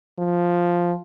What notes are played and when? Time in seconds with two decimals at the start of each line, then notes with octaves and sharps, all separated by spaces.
0.19 F3